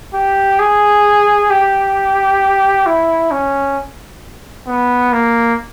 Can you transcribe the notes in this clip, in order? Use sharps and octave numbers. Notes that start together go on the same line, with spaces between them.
G4
G#4
G4
E4
C#4
B3
A#3